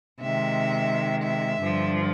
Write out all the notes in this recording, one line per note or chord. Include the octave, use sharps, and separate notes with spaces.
C3 D#3 G#3 E5
E5
G2 D3 F3